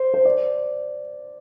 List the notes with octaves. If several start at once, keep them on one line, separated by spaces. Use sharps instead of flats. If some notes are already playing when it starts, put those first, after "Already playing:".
Already playing: C5
C5
D5